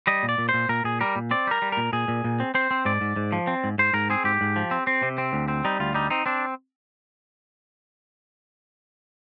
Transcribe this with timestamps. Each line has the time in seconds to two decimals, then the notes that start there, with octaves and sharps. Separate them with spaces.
0.07 G3 D#5
0.23 A#2
0.29 D5
0.38 A#2
0.49 C5
0.54 A#2
0.69 A#2 A#4
0.84 A#2 G#4
1.01 G3 A#4
1.16 A#2
1.31 C4 D5
1.47 G3 A#4
1.62 G3
1.72 A#2 A#4
1.93 A#2 G#4
2.08 A#2
2.24 A#2
2.40 C4
2.55 C4 C5
2.71 C4
2.85 G#2 D5
3.01 G#2
3.16 G#2
3.32 F3
3.47 C4
3.64 G#2
3.78 G#2 C5
3.93 G#2 A#4
4.10 C4 G#4
4.24 G#2 G4
4.41 G#2
4.56 F3
4.71 C4
4.87 C4
5.02 C3
5.18 C4
5.33 D2
5.48 C4
5.65 G3 D#4
5.80 D2 F4
5.94 G3 D#4
6.10 C4 D#4
6.26 C4 D4